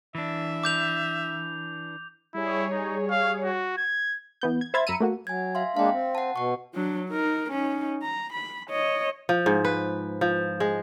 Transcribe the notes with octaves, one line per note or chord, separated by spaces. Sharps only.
E3 D4 E5
D6 G6 F7
G3 E4 G#4 C#5
D#4
F5
F#4
G#6
E3 B3 G6
G#6
C5 E5 F5 B5 G#6 A6
F#2 A#5 B5 E6 C#7 D#7
A3 A#3 F#4
F#3 G#5 G#6
E5 F5 C6
G#3 A#3 D4 F5 G5
C4
F#5 A5
B2 F#5 C#6
F#3 D4
D#4 A#4
C#4 D#4
A#5
B5
C#5 D#5
F3
G#2
B4
F3
G#3